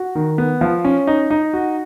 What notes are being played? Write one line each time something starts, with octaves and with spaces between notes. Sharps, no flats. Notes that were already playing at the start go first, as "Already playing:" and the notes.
Already playing: F#4
D#3
B3
F3
C#4
D#4
D#4
F#4